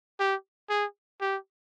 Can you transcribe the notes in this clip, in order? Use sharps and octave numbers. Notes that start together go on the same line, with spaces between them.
G4
G#4
G4